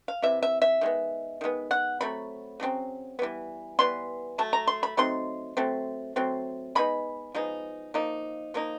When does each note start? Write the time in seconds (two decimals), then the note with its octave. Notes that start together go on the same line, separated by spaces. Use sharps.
0.08 F5
0.22 C3 E3 E5
0.43 E5
0.62 E5
0.81 D#3 G#3 B3
1.41 D#3 G#3 B3
1.71 F#5
2.01 C#3 F#3 A3 C4 B5
2.60 C#3 F#3 A3 C4
3.19 E3 G3 B3
3.79 E3 G3 B3 C6
4.38 F#3 A3 A5
4.53 A#5
4.67 C6
4.83 B5
4.97 F#3 A3 C4 D#4 C6
5.57 F#3 A3 C4
6.16 F#3 A3 C4
6.75 F3 G#3 B3 D#4 B5
7.34 F3 G#3 B3 D#4
7.94 F3 A#3 D#4
8.54 F3 A#3 D#4